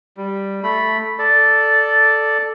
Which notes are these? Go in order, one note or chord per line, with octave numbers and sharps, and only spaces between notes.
G3
A3 B5
A4 D5